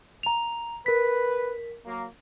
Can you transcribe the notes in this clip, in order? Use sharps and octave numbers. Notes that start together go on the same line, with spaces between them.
A#5 F7
A#4 B4 B6
F#3 A#3